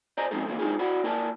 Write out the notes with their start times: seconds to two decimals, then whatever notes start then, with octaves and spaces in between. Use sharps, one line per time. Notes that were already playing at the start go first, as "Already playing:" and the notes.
0.17 C5 D5 D#5 G#5 A#5
0.31 F3 G#3 C4 C#4 D#4 A4
0.46 D3 E3 F#3 A#3 B3
0.59 G#3 D4 D#4 F4 G#4
0.79 E4 F#4 D5 F#5 B5
1.04 A#3 E4 A#4 D5 G#5 A5